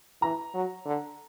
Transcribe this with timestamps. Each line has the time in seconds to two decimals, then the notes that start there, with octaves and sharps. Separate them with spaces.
0.22 E3 A#5
0.54 F#3
0.86 D3